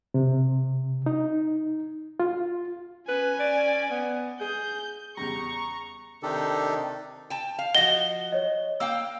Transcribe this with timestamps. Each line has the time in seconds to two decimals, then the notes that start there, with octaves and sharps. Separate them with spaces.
0.14 C3
1.06 D#4
2.20 F4
3.08 C#4 B4 G#5
3.40 D5
3.91 B3
4.41 G#4 G6
5.17 E2 C#3 G3 A#5 C#6
6.23 C3 D#3 D4 D#4 G4 A4
7.30 G5 A5
7.59 F5
7.75 F3 F#4 D#5 F#5 A#6 G7
8.33 C#5 D#5
8.80 A#3 F5 G5 E6